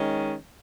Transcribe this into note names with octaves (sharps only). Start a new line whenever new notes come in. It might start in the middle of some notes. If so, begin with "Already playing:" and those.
Already playing: D#3 G#3 C#4